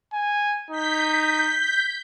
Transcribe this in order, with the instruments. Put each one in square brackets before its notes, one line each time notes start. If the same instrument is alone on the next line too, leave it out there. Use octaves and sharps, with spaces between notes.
[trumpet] G#5
[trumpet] D#4 [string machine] G6 B6